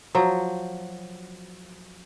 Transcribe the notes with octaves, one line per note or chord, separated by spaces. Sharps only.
F3 F#3